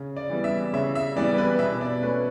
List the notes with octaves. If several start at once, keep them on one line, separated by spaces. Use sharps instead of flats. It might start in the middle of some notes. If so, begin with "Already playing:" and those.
Already playing: C#3
D5
E3 G3 B3
E5
C#3 E5
E5
E3 G3 B3 D5
B4
B2 E5
D5
A3 C#4 B4